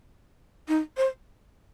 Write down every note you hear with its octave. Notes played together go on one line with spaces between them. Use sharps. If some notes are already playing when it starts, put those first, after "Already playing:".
D#4
C5